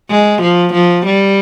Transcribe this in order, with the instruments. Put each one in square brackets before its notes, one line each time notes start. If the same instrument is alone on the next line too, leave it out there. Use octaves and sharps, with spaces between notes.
[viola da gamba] G#3
F3
F3
G3